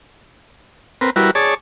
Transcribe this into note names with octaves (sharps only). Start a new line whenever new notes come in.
C4 A#4 B4
G3 E4 F#4 A#4 B4
G#4 C#5 D5 A5